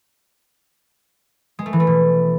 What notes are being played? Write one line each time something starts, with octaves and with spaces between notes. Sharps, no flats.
G#3
A3
E3
A3
B2